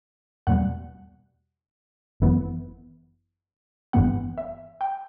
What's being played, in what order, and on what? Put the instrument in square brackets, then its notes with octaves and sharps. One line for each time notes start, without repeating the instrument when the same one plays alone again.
[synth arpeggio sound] E2 B2 G3 F#5
G1 F#2 E3 B3
G1 G2 E3 B3 F#5
E5
G5